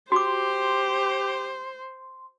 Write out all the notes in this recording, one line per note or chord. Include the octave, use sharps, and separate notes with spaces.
F#4 G4 C5 C6 D6